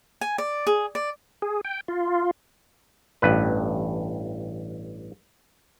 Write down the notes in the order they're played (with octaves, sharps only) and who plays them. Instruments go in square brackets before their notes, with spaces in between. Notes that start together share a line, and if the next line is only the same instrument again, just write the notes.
[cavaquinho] G#5
D5
G#4
D5
[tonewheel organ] G#4
G5
F4
[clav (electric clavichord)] A1 G2 B4